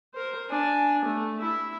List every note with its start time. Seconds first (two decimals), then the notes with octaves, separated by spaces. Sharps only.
0.14 A#4 C5
0.49 D4 G#5
1.05 A3
1.39 E4 E5